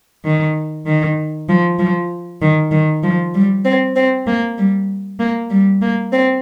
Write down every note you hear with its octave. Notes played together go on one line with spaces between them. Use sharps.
D#3
D#3
F3
F3
D#3
D#3
F3
G3
C4
C4
A#3
G3
A#3
G3
A#3
C4